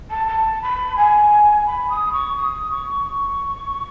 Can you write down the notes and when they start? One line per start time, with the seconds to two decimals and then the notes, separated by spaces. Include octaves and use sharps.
0.11 A5
0.28 A5
0.62 B5
0.97 G#5
1.66 B5
1.90 D#6
2.13 C#6
2.36 D#6
2.71 C#6